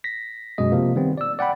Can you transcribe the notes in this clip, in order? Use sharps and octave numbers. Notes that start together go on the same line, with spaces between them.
A#6 B6
F#2 B2 G#3 D#5
C3 F3 A#3
D#3 G3 B3 C4
D5 E6
D5 F#5 G5 B5